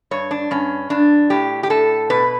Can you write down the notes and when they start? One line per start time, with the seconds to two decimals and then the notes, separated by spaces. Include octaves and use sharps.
0.11 G2 C#5
0.31 D4
0.51 G2 C#4
0.90 G2 D4
1.30 A2 G4
1.63 G4
1.70 A2 A4
2.10 B2 B4